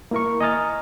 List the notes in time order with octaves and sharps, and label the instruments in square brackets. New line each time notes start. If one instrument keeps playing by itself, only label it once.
[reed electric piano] A#3 E4 A#4 C#6
D#5 G#5 A#5 D#6 F6 A6